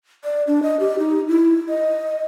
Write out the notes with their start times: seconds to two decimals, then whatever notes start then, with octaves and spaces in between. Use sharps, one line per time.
0.24 D5
0.47 D4
0.63 D#5
0.80 G4
0.99 D#4
1.28 E4
1.69 D#5